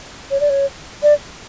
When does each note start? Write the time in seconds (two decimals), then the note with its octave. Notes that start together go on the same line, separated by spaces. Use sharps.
0.31 C#5
0.40 D5
0.50 C#5
1.03 D5